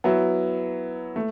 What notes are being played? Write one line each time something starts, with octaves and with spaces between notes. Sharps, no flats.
F#3 B3 E4
A3